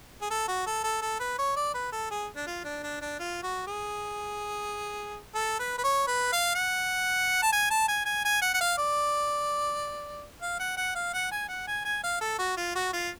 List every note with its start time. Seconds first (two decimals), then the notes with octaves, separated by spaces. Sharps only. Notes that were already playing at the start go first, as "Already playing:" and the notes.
0.21 G#4
0.30 A4
0.48 F#4
0.66 A4
0.84 A4
1.02 A4
1.20 B4
1.38 C#5
1.56 D5
1.74 B4
1.92 A4
2.11 G#4
2.36 D4
2.47 F4
2.64 D4
2.83 D4
3.01 D4
3.19 F4
3.43 F#4
3.67 G#4
5.35 A4
5.59 B4
5.78 B4
5.83 C#5
6.07 B4
6.32 F5
6.55 F#5
7.42 A5
7.52 G#5
7.71 A5
7.88 G#5
8.05 G#5
8.25 G#5
8.42 F#5
8.54 F#5
8.60 F5
8.78 D5
10.41 F5
10.59 F#5
10.77 F#5
10.95 F5
11.14 F#5
11.31 G#5
11.49 F#5
11.67 G#5
11.85 G#5
12.03 F5
12.21 A4
12.39 F#4
12.57 F4
12.75 F#4
12.93 F4